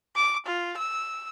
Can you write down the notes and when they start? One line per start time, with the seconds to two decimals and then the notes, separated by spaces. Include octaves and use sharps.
0.16 D6
0.46 F4
0.77 E6